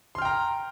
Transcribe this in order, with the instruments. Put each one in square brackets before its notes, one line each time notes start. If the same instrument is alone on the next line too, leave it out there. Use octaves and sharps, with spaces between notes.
[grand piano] C6
F6
G5
A#5